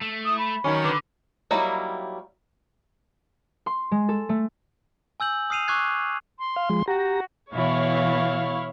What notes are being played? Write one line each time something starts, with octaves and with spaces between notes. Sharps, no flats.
A3
E4 D#6
B5
D#3 F#3 C#4
D3 B4 D6
F#3 G3 A#3 D#4 E4
C6
G#3
A4
A3
G#5 E6 G6 F#7
D#6 F6 C7 D#7 F7
C#6 D6 F6 F#6 G#6 C7
C6
F5
F3 G#3
F#4 G4 A#5
B2 E3 E4 C#5 F5